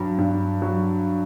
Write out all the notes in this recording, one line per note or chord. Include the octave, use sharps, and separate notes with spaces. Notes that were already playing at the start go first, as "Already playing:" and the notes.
Already playing: G2 F#3
G2
F#3